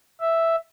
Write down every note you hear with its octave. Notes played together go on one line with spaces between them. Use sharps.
E5